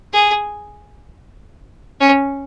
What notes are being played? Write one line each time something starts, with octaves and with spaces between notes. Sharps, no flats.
G#4
C#4